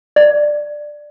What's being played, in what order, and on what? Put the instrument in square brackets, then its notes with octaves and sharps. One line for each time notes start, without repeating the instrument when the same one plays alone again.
[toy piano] D5